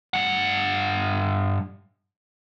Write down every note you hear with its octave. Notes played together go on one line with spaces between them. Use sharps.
G2 F#5